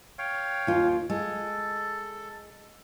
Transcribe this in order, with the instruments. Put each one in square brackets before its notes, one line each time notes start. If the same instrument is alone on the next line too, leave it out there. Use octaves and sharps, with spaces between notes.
[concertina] C#5 F5 G5
[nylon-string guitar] D#2 F4
[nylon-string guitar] G#3 [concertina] A4